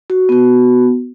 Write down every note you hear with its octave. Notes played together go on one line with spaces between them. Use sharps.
F#4
B3 F#4